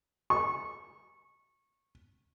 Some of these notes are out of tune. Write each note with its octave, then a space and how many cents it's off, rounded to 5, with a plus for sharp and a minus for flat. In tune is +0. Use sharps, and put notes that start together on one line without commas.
C#6 -20